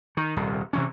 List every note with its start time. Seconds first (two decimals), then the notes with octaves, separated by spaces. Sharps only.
0.17 D#3
0.36 D#1 C2
0.73 C3 E3 C#4